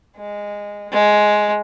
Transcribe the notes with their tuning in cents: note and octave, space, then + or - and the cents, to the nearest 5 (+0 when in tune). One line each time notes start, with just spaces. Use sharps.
G#3 -15
G#3 +10